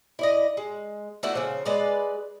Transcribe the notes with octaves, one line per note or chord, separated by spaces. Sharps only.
E4 D5 D#5
G#3
A3 D4 E4 F#4
C#3 F3
G#3 B4 D5